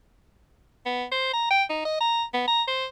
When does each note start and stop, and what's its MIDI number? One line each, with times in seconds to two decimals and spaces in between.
0.85 1.04 59
1.12 1.31 72
1.33 1.49 82
1.50 1.63 79
1.70 1.85 63
1.85 1.96 75
2.00 2.23 82
2.33 2.46 59
2.47 2.62 82
2.68 2.85 72